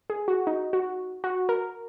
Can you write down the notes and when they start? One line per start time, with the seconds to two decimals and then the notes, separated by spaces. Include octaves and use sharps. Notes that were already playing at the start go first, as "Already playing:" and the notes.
0.10 G#4
0.28 F#4
0.47 D#4
0.73 F#4
1.24 F#4
1.49 A#4